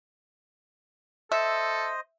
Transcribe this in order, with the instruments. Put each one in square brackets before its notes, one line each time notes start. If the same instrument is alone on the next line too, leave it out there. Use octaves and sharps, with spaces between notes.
[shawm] A4 [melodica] C5 D#5 [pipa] E5